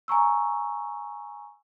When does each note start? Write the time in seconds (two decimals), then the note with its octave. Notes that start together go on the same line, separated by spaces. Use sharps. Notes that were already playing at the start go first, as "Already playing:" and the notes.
0.08 G#5 A#5 C#6 E6